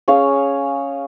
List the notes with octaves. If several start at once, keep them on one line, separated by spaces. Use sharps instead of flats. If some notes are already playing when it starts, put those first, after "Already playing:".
C#4 G#4 C#5 F5